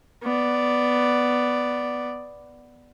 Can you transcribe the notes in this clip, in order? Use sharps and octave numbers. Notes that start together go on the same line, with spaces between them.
B3 D5